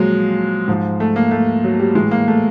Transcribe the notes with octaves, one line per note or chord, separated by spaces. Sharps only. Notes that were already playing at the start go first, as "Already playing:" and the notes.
Already playing: A#2 F3 F#3 G#3
G#2 F3
A3
A#3
A3
F#3
G3
A2 E3 G#3
A#3
A3